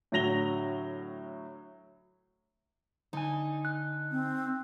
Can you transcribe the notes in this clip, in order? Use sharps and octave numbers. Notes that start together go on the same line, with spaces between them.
A2 D3 F#3 A#6 F7 G7
D3 D#4 G#5
F#6
C4